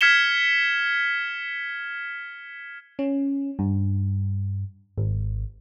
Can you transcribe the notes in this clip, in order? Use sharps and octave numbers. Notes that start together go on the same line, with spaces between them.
F6 G#6 B6 C#7 E7 G7
C#4
G2
G#1